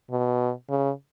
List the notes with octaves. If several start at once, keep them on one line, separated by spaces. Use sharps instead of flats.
B2
C#3